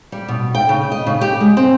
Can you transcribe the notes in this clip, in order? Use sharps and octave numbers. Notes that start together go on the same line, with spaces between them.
G3
B2
G5
C#3
D#5
C#3
G4
G#3
C4